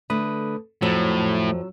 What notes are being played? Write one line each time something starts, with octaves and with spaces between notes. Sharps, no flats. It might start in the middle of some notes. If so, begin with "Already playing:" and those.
D3 A3 B4 B5 D#6
F2 A2 F3 F#3 E6